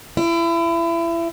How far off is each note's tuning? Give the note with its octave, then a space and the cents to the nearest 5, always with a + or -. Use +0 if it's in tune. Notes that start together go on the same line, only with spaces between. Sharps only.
E4 +30